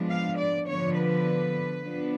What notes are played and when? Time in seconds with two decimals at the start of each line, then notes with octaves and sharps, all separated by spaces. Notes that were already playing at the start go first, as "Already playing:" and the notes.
Already playing: F3 G#3 B3 D4
0.09 F5
0.37 D5
0.67 D3 F3 B3 D4 C#5
0.96 B4
1.83 F3 B3 D4